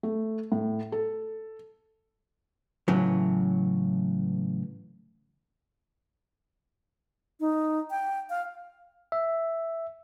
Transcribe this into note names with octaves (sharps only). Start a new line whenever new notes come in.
A3
A2
A4
A2 C#3 E3 F#3
D#4
G5
F5
E5